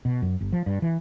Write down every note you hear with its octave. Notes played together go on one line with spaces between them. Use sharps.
B2
F#2
G1
F3
G2
E3